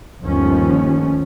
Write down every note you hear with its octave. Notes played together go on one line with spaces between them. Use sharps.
G1 D#2 D#3 F3 A3 C#4